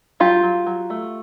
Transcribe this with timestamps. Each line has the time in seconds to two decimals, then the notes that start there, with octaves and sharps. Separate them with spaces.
0.20 F#3 F4 G4
0.43 F#3
0.66 F#3
0.90 A3